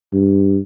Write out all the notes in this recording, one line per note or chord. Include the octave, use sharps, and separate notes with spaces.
G2